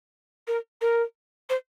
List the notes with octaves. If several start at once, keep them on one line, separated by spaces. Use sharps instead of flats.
A#4
A#4
C5